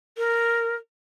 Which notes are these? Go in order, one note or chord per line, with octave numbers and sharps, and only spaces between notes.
A#4